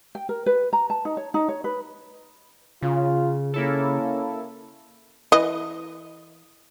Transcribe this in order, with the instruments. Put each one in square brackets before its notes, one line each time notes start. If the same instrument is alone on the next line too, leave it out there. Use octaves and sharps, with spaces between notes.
[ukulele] G5
A#4
B4
A#5
A5
D#4
C#5
D#4
C#5
B4
[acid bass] C#3 [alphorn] F4
[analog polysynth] A#3 E4 A4 [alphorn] C#4
[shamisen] E3 D#5